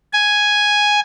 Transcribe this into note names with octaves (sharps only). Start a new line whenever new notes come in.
G#5